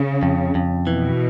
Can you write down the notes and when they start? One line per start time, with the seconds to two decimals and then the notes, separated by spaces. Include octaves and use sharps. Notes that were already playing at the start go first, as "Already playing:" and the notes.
Already playing: C#3
0.23 F2
0.55 F2
0.87 B2 E3